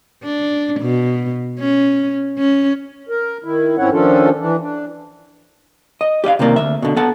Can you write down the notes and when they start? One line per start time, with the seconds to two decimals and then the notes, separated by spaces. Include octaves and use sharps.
0.24 D4
0.80 B2
1.59 C#4
2.38 C#4
3.09 A#4
3.44 D#3 E4
3.78 G#2 C4 C#4 E4 C#5 F#5
3.91 D#3 F3 C#4 D4 F4 A4
4.39 E3 D4
4.61 D4
6.01 D#5
6.24 G4 D5 D#5 F5
6.39 C2 C3 D#3 A#3 D5
6.56 D2 E5
6.82 B2 D3
6.96 B3 A4 F#5 A5